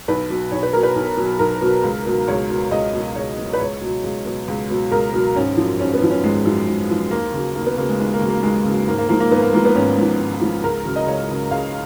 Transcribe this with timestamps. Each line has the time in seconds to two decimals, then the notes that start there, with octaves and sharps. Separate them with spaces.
0.08 B1 B4
0.30 B2 F#3
0.51 B1 C#5
0.63 B4
0.73 B2 F#3 A#4
0.83 B4
0.95 B1
1.17 B2 F#3
1.39 B1 A#4
1.62 B2 F#3
1.83 C#2
2.06 B2 F#3
2.28 C#2 C#5
2.49 B2 F#3
2.71 C#2 D#5
2.93 B2 F#3
3.16 C#2 C#5
3.37 B2 F#3
3.53 B4
3.60 C#2 C#5
3.81 B2 F#3
4.04 C#2
4.26 B2 F#3
4.48 C#2
4.70 B2 F#3
4.91 C#2 A#4
5.13 B2 F#3
5.36 G#1 C#4
5.57 F#2 F3
5.80 G#1 C#4
5.94 B3
6.02 F#2 F3
6.09 C#4
6.23 G#1 G#3
6.45 F#2 F3
6.67 G#1
6.90 F#2 F3
7.11 D#2 A#3
7.34 C#3 F#3
7.55 D#2 A#3
7.66 B3
7.77 C#3 F#3 A#3
7.89 G#3
7.99 D#2 G#3
8.13 A#3
8.21 C#3 F#3
8.29 A#3
8.43 D#2 G#3
8.65 C#3 F#3
8.87 G#1 A#3
8.98 A#3
9.09 G#2 F3 A#3
9.20 A#3
9.31 G#1 B3
9.42 A#3
9.53 G#2 F3 A#3
9.65 B3
9.75 G#1 C#4
9.97 G#2 F3
10.20 G#1
10.41 G#2 F3
10.64 C#2 A#4
10.85 C#3 F#3
10.96 D#5
11.07 C#2 C#5
11.30 C#3 F#3
11.51 C#2 F5